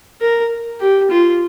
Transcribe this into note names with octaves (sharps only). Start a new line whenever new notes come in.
A#4
G4
F4